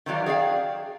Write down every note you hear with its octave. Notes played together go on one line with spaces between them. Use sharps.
D#3 E3 F#3 D5 F5
G#4 D5 E5 F5 G5